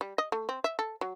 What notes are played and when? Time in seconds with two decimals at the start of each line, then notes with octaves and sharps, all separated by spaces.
0.01 G3
0.18 D#5
0.32 A3
0.49 C4
0.64 E5
0.79 A4
1.01 F#3